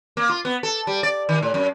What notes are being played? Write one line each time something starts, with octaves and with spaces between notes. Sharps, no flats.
A#3
F4
B3
A4
G3
D5
D#3
A2
F#2